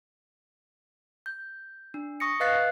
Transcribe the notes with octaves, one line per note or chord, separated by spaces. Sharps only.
G6
D4
C#6 D#6 A#6 C#7
B4 D#5 F5 F#6 A6 C7